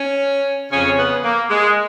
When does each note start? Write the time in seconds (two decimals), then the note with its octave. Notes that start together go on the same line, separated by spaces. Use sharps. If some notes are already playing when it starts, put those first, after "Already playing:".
Already playing: C#4
0.71 F2 C#3 C#4
0.98 B3
1.24 A#3
1.49 G#3